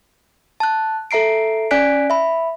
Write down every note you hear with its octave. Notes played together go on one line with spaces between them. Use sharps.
A5 F#6
A4 E5 A#5 C7 D7
C#4 D5 G#5 F#6 B6 D7
E5 B5